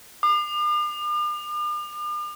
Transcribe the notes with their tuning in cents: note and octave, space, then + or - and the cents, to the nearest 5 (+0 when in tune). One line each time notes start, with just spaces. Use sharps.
D6 +45